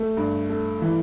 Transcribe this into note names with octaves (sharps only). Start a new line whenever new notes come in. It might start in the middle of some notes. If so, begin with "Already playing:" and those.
Already playing: A3
G2
A3
E3